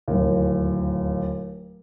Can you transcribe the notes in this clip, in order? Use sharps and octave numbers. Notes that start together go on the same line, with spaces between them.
D1 D#2